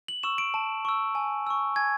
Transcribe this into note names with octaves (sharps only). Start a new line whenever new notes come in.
F#7
C#6 E6 E7
D7
A5
C#6 E6
G#5
C#6 E6
G#5 G#6